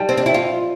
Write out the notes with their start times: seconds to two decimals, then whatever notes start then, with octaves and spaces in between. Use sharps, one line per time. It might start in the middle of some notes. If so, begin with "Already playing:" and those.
Already playing: G3 G5 A5
0.09 C4
0.17 D4
0.26 E4 G5
0.34 F4 F5